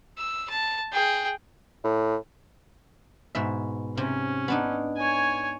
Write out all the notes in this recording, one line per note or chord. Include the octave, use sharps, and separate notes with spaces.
E6
A5
G#4 G5
A2
G#2 B2 E5
C3 C#4
B3 D4 D#4
C#5 G#5